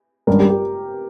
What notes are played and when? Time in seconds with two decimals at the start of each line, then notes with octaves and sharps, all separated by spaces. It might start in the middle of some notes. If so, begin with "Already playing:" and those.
0.27 G#1 G2 G3 C#4 A#4
0.39 G4
0.49 G4